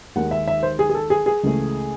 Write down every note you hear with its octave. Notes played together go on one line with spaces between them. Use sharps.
D#2 D#3 G#3 F#5
E5
E5
C5
G#4
G#4
A4
G#4
G#4
C#2 C#3 E3 A3